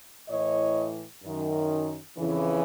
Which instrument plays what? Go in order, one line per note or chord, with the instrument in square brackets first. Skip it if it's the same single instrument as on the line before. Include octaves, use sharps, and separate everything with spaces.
[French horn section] A2 E3 C#5 D#5
F#2 D#3
F2 C#3 E3